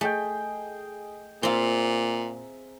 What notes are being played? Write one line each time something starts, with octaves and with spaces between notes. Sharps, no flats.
A3 G#4 D#5 G5
A#2 C4 F4 E5 A#5